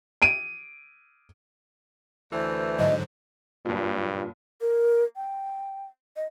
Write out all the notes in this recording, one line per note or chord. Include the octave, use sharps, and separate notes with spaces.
D7 D#7
D2 E3 C5
G#2 D3 F#3 D#5
F#1 G2 A#2
A#4
G5
D#5